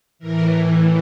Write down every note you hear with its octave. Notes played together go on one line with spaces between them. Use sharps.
A2 E3 A#4